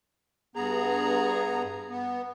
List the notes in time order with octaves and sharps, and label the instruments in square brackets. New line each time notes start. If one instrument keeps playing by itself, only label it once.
[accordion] G2 B3 A#5 [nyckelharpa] G#4
[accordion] B3